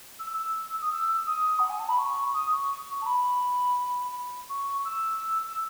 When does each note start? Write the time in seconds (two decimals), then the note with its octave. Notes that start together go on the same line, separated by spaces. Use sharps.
0.19 E6
0.33 E6
0.81 D#6
0.91 E6
1.26 D#6
1.59 F#5
1.69 G#5
1.79 A5
1.89 B5
1.98 C#6
2.34 D#6
2.52 C#6
3.01 A5
3.06 B5
4.49 C#6
4.85 E6
5.47 E6